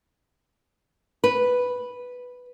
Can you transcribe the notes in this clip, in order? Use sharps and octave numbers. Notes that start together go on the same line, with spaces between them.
B4